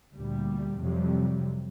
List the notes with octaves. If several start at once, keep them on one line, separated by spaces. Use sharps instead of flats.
D2 A#2 G3
F2 C3 F#3 G3